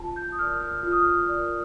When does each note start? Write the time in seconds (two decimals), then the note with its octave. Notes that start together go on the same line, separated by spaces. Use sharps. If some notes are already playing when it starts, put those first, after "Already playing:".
Already playing: F4 A5
0.16 G6
0.32 D#6
0.39 A#4 D5 F6
0.61 F6
0.83 F4 F6
0.92 D#6
1.01 F6
1.29 A#4 D5